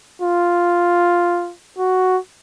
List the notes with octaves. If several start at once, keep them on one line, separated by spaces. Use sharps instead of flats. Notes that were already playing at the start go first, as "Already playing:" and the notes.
F4
F#4